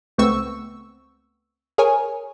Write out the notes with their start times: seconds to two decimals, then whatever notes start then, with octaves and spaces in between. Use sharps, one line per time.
0.18 C#2 A3 B3 C4 C#6 E6
1.78 G#4 A#4 C#5 G#5